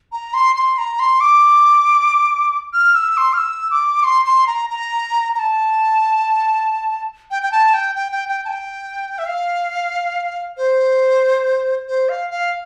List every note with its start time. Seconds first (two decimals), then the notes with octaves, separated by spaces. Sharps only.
0.12 A#5
0.34 C6
0.56 C6
0.78 A#5
0.99 C6
1.20 D6
2.73 F6
2.95 E6
3.17 C6
3.33 F6
3.38 E6
3.71 D6
4.03 C6
4.25 C6
4.47 A#5
4.70 A#5
5.35 A#5
5.39 A5
7.31 G5
7.42 G5
7.52 A5
7.74 G5
7.95 G5
8.12 G5
8.29 G5
8.45 A5
8.49 G5
9.18 E5
9.26 F5
10.57 C5
11.88 C5
12.09 F5
12.30 F5